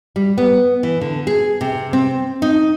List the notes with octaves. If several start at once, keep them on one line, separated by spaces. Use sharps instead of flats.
G3
B3
E3
D3
G#4
C3
C4
D#4